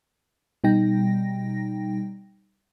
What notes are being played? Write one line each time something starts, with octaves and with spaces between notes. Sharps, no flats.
B2 G3 D#4 G5 A#6